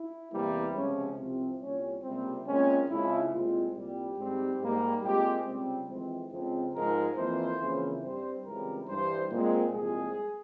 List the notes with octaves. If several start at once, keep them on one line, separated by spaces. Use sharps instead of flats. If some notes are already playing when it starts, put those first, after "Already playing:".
Already playing: E4
E2 C3 E3 G3 A#3
C#2 C3 F3 C#4
C2 C3 F3 C4
C2 A#2 G3 C#4
C#2 C3 G3 A#3 C4
A#2 G#3 C4 C#4
F2 C#3 F3 G#3 E4
C2 A#2 G#3 C4 F4
C2 A#2 G3 C4 G4
G#2 G3 C4
G#2 G3 A#3
A#2 G#3 C4 G4
C#2 C3 G3 C4
F2 E3 G#3 C4
F2 C#3 F3 G#3 C4
G#2 F3 G#3 A#4
F2 E3 A#3 C5
F2 C#3 E3 A#3
G2 G3 C4 C5
C#2 C#3 E3 G3 C4 A#4
G2 E3 G3 C5
A#2 G#3 C4
C2 A#2 F3 G#3 C4 G#4